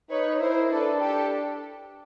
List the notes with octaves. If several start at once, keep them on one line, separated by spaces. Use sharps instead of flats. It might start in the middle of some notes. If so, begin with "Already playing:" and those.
D#4 B4 C#5
E4 A#4 C5
D4 A4 B4
G4 A4